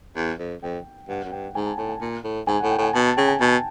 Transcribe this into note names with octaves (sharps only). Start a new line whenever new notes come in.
E2
F2
F2 G5
G2 F#5
F#2
G2 G5
G#2 G#5
A5
A2 A5
G#5
A#2
A2
G#2 G#5
F#5
A2
G5
A2 G#5
B2 A5
A5
C#3 G5
G#5
B2 A5